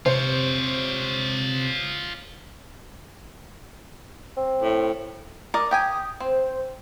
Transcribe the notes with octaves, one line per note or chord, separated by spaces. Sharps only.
C3 F4 C5 C#5
C4
A2
A#4 D5 D#5
G4 G5 G#5 D#6
C4 C5